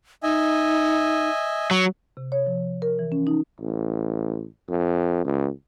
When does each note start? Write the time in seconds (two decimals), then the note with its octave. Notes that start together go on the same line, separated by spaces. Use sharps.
0.23 D#4 D#5 E5 G#5
1.71 F#3
2.17 C3
2.32 C#5
2.47 F3
2.82 A#4
2.99 E3
3.12 C#4
3.27 D#4
3.61 A1
4.69 F2
5.25 C#2